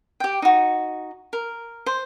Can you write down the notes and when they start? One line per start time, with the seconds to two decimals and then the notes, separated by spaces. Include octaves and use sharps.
0.20 G4 G5
0.42 D#4 F#4
1.33 A#4
1.86 C5